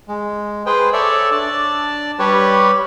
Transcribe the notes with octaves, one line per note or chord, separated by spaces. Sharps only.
G#3
G#4 B4 C5 G5
A4 C#5 D5 E5
D4 D5 A5
G3 G4 B4 C#5